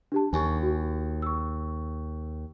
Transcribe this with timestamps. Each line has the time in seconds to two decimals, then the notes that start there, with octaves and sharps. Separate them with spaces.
0.12 D4 G4 A5
0.33 D#2 G#5 C#6
0.63 F#4
1.22 C#6 E6